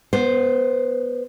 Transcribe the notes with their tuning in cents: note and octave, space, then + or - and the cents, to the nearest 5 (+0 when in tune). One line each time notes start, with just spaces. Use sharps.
B3 -10 C5 +0